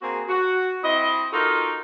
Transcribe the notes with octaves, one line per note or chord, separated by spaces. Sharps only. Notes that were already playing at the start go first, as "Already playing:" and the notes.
A#3 C4 F#4 G#4
F#4
C4 E4 D#5
D#4 F4 F#4 A4 A#4